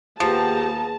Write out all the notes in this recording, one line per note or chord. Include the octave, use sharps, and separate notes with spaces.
D#2 F3 B3 G4 G#4 A5 A#5